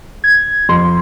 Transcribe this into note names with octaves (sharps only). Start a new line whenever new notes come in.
G#6
F2 C6